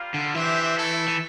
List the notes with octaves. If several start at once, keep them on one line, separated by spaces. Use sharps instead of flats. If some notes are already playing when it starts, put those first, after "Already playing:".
Already playing: G3 A#3 F4
D3
E3 D4 G4 C5 E5
A3 E4 A4
E3